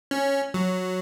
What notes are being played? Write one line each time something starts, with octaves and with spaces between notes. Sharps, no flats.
C#4
F#3